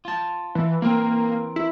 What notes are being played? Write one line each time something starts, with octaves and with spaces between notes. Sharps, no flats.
F4 A5
E3
E3 A#3 C4 A#4
E4